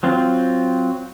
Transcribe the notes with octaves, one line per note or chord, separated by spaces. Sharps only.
F#3 C4 F4